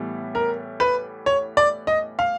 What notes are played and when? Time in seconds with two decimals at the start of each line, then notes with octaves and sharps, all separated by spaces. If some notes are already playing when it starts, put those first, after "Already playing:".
Already playing: A2 E3 G3 B3
0.35 A#4
0.80 B4
1.26 C#5
1.57 D5
1.87 D#5
2.19 F5